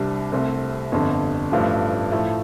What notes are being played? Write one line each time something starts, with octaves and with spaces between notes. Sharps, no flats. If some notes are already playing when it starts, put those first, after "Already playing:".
Already playing: C2 C3 G3 D4
C2 C3 A3 C4
G1 F2 D3
A1 G2 F3 A3 D4
A2 F3 A3